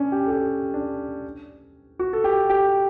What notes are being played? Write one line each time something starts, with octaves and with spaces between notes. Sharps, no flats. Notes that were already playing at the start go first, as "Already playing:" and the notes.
Already playing: C#4 D4
G4
A4
G4
D4
F#4
A4
G4
G4